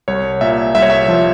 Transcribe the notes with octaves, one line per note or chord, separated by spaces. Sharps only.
C2 C#5
A#2 E5
C2 E5
C#5
E5
F3